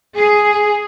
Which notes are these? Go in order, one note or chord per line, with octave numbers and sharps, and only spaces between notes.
G#4